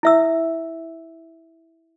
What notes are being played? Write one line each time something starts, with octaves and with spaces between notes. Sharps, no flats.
E4 E5 E6